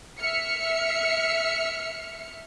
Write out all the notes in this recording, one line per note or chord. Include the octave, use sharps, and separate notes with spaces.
E5 F6 C#7